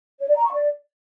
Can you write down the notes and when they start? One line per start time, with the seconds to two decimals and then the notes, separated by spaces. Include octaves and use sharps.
0.20 C#5
0.28 D5
0.36 A#5
0.45 C#6
0.53 D5